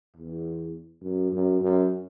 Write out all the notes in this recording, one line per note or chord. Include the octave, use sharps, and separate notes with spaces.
E2
F#2
F#2
F#2